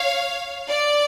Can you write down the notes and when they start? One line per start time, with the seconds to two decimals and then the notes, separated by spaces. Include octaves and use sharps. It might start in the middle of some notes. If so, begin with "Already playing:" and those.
Already playing: C#5 F5
0.68 D5